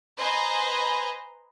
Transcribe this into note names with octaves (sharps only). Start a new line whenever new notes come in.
B4 C5 D#5 G#5 A#5 C6